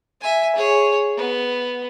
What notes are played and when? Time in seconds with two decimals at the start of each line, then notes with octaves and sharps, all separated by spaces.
0.21 E5 G#5
0.56 G#4 C#5
1.17 B3